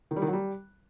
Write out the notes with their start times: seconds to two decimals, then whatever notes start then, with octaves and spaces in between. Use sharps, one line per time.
0.11 D#3
0.16 G3
0.22 D#3
0.27 F#3
0.33 G3